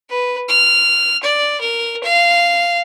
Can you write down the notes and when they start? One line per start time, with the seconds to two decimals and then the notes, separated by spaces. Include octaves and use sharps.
0.10 B4
0.49 F6
1.23 D5
1.61 A#4
2.03 F5